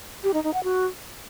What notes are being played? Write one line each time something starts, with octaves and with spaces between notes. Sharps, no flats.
G4
D#4
D#4
F#5
F#4